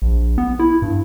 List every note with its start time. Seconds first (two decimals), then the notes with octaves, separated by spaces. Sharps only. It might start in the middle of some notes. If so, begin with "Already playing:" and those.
0.02 A#1
0.38 B3
0.59 E4
0.82 G2